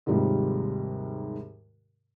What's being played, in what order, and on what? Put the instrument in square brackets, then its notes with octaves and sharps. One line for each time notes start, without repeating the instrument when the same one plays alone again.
[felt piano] D#2 G#2 C3 D#3 F3 G3